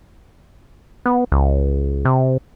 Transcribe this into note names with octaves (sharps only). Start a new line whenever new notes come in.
B3
C#2
C3